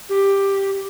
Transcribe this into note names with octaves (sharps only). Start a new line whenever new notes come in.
G4